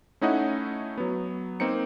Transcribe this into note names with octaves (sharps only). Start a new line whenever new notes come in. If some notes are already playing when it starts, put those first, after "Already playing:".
A3 C#4 D#4 E4 D#5 F#5
F#3 B3
A#3 C4 D#4 C#7